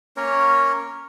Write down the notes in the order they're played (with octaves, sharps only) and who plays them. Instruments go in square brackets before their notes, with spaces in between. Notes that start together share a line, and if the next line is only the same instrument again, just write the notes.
[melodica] A#3 C#4 A#4 C#5